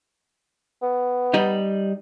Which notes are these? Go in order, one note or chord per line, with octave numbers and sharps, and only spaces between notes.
B3
G3 D#4